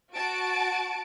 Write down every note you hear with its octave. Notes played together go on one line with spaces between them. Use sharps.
F#4 A5 D7